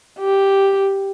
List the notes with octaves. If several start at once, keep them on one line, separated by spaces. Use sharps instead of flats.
G4